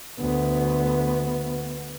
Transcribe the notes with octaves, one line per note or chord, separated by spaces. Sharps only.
D2 B3